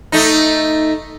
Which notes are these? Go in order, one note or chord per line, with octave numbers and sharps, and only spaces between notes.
A3 D#4